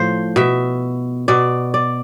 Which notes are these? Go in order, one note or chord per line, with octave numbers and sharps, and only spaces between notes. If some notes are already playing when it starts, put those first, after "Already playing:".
Already playing: A2 F3 C5
B2 E5
B2 D5
D5